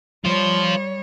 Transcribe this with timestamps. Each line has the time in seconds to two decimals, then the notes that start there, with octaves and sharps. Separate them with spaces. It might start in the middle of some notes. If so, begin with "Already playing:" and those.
0.25 G3 F4 C5 C#5